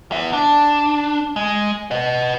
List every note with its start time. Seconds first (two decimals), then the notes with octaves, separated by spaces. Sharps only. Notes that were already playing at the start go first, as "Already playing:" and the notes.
0.12 B3 E5
0.33 D4
1.36 G#3
1.91 B4 D#5